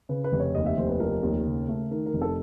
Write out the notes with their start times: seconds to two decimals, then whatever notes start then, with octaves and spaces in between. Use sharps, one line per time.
0.09 C#3 B4
0.24 B4
0.32 F1
0.39 C#5
0.55 D#2 D#5
0.66 E5
0.77 F1 C5
0.89 B4
1.00 F3 A#4
1.23 D#2
1.46 C#3
1.69 A3
1.91 D#3 A#4
2.06 A#4
2.13 F1
2.22 A4